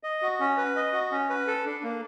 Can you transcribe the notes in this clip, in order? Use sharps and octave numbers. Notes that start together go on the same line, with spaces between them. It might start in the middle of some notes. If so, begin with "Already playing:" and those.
D#5
F#4
C#4
B4
D#5
F#4
C#4
B4
A4
D4
A#3